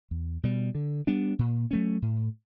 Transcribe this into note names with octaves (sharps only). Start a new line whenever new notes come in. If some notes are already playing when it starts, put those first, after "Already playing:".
E2
B2 G3
D3
G3 B3 D4
A#2
F#3 A3 C#4
A2